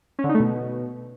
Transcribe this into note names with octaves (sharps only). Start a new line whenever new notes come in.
C#4
D3
D#4
A3
B2